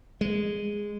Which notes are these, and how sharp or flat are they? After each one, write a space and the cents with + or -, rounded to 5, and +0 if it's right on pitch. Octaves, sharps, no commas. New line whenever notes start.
G#3 -10